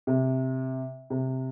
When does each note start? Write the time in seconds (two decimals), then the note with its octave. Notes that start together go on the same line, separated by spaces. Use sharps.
0.07 C3
1.10 C3